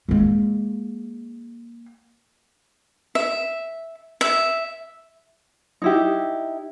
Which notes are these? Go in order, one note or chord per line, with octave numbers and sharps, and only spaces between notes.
G#3 A#3
E5
E5
D#4 E4 G4